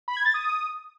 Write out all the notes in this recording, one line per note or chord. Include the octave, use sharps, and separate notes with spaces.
B5
G#6
A6
D#6